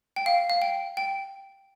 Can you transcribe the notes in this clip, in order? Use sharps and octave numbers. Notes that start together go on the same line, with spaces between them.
G5
F5
F5
G5
G5